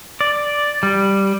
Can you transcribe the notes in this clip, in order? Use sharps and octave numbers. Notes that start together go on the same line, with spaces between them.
D5
G3